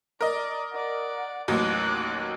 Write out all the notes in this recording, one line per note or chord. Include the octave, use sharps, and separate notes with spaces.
A#4 D5 D#5
D5 F#5
A1 D#2 F#3 D6 F#6